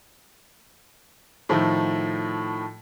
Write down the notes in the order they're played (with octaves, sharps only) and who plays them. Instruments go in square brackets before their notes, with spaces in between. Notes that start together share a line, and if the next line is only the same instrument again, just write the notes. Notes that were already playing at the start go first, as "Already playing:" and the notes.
[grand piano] A2 D#3 F3 A3